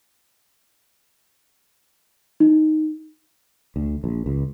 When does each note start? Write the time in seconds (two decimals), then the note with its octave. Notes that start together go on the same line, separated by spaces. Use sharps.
2.40 D#4
3.76 D2
4.04 A#1
4.26 C#2